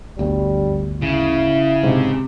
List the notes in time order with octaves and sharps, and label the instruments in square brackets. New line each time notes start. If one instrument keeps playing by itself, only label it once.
[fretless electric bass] G1 D2 [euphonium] G3
[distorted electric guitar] C#3 [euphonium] E4
[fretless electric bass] G#2 [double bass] C3